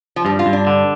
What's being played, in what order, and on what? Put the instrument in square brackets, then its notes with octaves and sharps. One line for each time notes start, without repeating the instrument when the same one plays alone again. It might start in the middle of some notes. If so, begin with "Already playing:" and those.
[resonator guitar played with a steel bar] F3
[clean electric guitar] G2 [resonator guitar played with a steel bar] G3
[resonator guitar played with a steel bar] F4
[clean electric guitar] G2
[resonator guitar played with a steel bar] D4
[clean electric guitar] D3